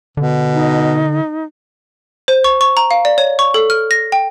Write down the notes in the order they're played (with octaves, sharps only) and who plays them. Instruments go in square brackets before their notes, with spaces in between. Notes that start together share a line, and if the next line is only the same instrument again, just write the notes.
[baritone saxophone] B2 [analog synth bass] D3
[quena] D#4
[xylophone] C5
C#6
C#6
A#5
F5
D5
C#5
C#6
A4
F6
A#6
G5